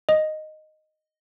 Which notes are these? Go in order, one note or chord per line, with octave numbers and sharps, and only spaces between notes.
D#5